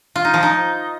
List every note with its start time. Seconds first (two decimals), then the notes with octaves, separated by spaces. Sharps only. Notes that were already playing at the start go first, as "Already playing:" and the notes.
0.16 F4
0.25 D#4
0.34 F3
0.43 D#4